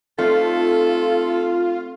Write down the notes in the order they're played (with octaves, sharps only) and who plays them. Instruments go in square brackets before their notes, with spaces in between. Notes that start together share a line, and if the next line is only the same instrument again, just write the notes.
[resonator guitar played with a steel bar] A3 [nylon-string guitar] C4 D#4 D5 [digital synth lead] F4 [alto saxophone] A4